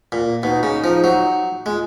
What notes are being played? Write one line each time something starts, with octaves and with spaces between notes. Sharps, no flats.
A#2
B2 D#4
C#3
F3
F#3
G#3 F4